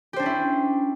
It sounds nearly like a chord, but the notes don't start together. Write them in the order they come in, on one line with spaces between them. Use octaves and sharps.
G4 C5 D4 C#4 E4